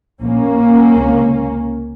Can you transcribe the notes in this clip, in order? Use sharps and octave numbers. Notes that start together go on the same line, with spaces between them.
A#1 A#2 A#3 C#4
C#2 C3